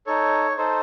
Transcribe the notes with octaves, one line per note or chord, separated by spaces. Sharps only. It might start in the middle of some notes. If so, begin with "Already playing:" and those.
D#4 A4 C#5
D#4 A4 C5